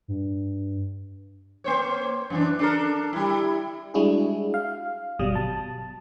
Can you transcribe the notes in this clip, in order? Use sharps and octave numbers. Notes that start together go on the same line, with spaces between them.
G2
A#3 C5 C#5
F#2 E3 D4
D4 A4 A#4
G3 E4
G3 G#3 D4 E4 F#4 G#4
F5
G1 B2 F#3 G3 D#6
A5